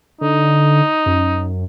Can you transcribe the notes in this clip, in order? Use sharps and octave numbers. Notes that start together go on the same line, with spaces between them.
D3 D#4
F#2